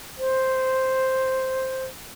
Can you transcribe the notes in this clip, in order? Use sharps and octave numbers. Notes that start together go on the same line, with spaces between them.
C5